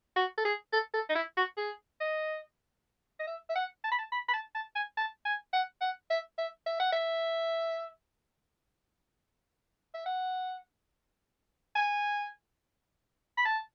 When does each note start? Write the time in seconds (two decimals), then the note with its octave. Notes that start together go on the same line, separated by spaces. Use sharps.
0.16 F#4
0.38 A4
0.45 G#4
0.73 A4
0.94 A4
1.09 D#4
1.15 E4
1.37 F#4
1.57 G#4
2.01 D#5
3.20 D#5
3.27 E5
3.50 E5
3.56 F#5
3.84 A5
3.91 B5
3.99 A5
4.12 B5
4.28 B5
4.34 A5
4.55 A5
4.76 G#5
4.97 A5
5.25 G#5
5.53 F#5
5.81 F#5
6.10 E5
6.38 E5
6.66 E5
6.80 F#5
6.93 E5
9.94 E5
10.06 F#5
11.75 G#5
13.38 B5
13.45 A5